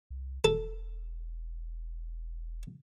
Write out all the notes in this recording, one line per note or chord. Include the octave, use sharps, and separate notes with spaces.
C2
E1 A4